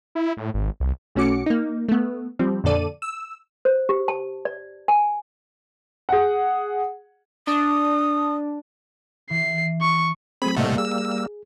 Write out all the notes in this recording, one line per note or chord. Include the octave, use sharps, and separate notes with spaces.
E4
A2
G#1
C2
B1 A3 C#4 F#4 D6 C#7
A#3 D#4
A3 B3
F3 G3 C4
F2 A#2 D3 A4 D5 D#7
E6
C5
G4
A5
D5
G#5
G#4 F#5
D4 D#6
E3 C7
C#6
F#3 A3 C4 G#4 B5
A2 C3 G3 A3 A#3 D#5 F#5
G#4 E6